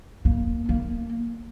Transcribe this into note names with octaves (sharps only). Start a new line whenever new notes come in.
A#3
A#3